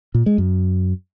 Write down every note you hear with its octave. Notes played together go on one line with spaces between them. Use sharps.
A#2
G#3
F#2